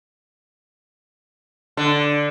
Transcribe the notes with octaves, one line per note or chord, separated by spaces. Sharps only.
D3